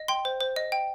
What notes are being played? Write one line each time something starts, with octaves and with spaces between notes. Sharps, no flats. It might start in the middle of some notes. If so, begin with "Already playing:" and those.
Already playing: D#5
G5 C6
C5
C5
D#5
G5